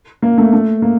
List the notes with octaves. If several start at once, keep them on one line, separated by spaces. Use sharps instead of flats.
A#3
A3
A3
A#3